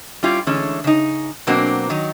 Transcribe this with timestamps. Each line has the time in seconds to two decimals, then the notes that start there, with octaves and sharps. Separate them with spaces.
0.23 G3 C#4 E4 F4 G4
0.47 D3 E3 G#3 A3 C#4
0.84 C#3 D#4
1.47 B2 F#3 A#3 C4 D4 F#4
1.89 D#3 F#3 D#4